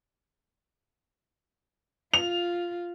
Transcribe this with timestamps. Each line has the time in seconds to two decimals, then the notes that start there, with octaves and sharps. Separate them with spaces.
2.14 F4 F7